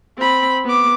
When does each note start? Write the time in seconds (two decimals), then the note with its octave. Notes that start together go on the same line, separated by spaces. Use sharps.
0.18 C4 B5
0.65 B3 D6